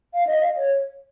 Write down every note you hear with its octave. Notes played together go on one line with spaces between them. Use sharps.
F5
D#5
F5
C#5